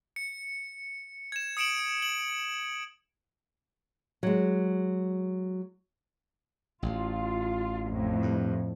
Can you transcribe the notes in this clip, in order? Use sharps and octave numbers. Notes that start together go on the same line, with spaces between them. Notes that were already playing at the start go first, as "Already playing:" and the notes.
C#7
G#6 E7
D#6 C#7 D7 E7 F#7
F#7
F#3 G#3
A1 F4
F2 A2
G2